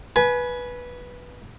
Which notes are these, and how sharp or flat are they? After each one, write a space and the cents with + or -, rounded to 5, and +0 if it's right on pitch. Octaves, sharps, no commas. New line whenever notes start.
B4 -10 G#5 +25